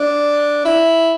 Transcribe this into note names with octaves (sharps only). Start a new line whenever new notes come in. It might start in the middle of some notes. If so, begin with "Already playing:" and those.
Already playing: D4
E4